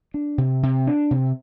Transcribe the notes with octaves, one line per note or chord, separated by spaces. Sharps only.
D4
C3
C3
D4
C3